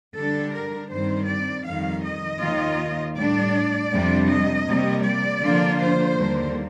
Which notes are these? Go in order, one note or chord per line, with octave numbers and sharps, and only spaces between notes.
D3 G3 D4 A4
A#4
G2 D#3 G3 C4 C5
D5
F2 D#3 G3 F5
D#5
D#2 D#3 A#3 F4
A2 G3 D4 D5
F2 C3 G3 D4
D#5
C3 G3 A#3
D5
D3 F3 A#3 D4 F4
C5
D#2 D3 G3 A#3